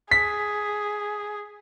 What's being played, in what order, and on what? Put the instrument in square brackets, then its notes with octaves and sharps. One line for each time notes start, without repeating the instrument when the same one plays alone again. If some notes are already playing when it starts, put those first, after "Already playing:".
[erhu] G#4 [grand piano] B6